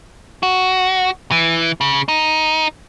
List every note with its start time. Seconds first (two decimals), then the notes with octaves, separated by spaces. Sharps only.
0.43 F#4
1.31 E3
1.81 C#3
2.08 D#4